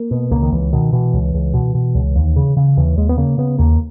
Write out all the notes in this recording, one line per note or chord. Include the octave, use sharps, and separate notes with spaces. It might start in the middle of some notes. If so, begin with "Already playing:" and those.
Already playing: A#3
B2
C#2 A#3
D#3
C#2 E3
B2 D#3
B2 E3
C#2
C#2
B2
B2
C#2
D#2
C#3
C#3
D#2 E3
D#2 G#3
B3
C#3 A#3
C#3 B3
D#2 A#3